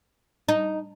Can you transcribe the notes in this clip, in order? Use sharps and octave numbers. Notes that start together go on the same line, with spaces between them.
D#4